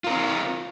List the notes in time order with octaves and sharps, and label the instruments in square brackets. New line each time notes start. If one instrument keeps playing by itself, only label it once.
[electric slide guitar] F4
A#4
C4